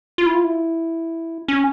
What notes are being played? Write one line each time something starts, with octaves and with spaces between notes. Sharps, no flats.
F4
E4
F4
E4
C#4